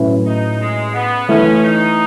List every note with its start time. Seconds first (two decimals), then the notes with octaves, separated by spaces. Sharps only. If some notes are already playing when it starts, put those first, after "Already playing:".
Already playing: A2 F#3 C#4 E4 B4
0.25 D#4
0.60 G#3
0.94 B3
1.28 E3 A3 C#4 E4
1.63 D#4